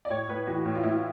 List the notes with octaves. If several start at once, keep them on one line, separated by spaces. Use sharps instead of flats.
D5
A2 C#5
A2 B4
E3 F#4
A2
F4
A2 E4